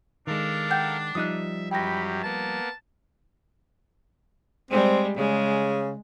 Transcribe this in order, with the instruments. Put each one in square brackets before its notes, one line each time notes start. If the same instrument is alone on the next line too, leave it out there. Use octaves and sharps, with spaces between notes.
[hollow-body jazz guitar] D#3 G#3 [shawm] D4 [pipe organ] A4 A#4 F5
[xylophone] F#5 G5 G6
[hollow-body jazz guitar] F3 G3 D#4 [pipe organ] E5 [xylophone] D#6 F#6
[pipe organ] F#2 F#3 G4 [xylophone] G5 A#6 [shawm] B5
[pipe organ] A#3 B3 [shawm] A5
[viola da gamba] G3 G#3 [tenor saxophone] C4
[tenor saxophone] C#3 [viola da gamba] G#3